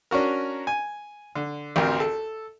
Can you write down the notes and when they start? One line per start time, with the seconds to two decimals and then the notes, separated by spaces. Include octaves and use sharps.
0.11 C#4 D4 F#4 A#4
0.67 G#5
1.35 D3
1.76 A1 D2 C4 A#4 F6
2.00 A4